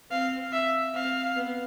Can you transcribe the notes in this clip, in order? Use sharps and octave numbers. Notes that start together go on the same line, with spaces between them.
C4 F5
E5
C4 F5
B3